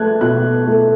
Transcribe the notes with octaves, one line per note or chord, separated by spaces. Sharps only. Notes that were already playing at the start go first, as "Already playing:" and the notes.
Already playing: A3 A5 F#6 G#6
B2 F#6
A3